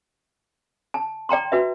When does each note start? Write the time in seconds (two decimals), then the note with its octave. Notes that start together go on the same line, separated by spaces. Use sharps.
0.94 A5
1.29 D5 G5 A#5 C6
1.52 F#4 B4 E5